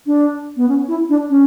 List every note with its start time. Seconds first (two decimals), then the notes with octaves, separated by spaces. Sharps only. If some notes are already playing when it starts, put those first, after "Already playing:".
0.06 D4
0.57 B3
0.69 C#4
0.88 E4
1.09 D4
1.30 C#4